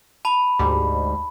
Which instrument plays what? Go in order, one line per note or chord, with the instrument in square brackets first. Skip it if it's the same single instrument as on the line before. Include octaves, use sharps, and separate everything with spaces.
[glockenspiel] A5 B5
[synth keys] D2 G#2 G3